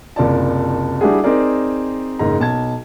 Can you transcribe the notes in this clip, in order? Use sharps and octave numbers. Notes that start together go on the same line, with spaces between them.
F#1 C2 F4 D5 A5
G3 D4 E4 F#4 G#4
C4 D#4 G#4 A#4 D5
F#1 G#2 A#5
B1 A5 G#6